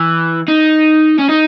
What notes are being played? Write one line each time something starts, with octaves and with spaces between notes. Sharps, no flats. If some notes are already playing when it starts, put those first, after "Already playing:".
Already playing: E3
D#4
C#4
D#4